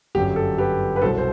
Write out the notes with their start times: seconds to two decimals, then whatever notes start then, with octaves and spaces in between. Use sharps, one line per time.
0.15 G1 F#2 F#3 G4
0.36 A4
0.58 G4 B4
0.96 B4
1.02 C2 B2 F#3 A4 C5
1.18 C5